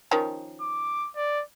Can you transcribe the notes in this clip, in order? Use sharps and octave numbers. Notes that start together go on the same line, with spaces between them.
D#3 F3 C#4
D6
D5